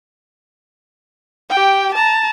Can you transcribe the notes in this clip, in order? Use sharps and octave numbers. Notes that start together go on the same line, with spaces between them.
G4 G5
A5 A#5